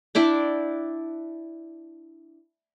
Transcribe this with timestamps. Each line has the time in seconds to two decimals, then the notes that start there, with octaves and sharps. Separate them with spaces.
0.15 D4 E4 D5 G5